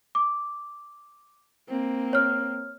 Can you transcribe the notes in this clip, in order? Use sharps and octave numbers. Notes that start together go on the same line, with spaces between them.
D6
A#3 C4
C#5 F6